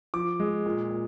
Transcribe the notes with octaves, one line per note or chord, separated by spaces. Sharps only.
F3 D6
G#3
A#2
A#2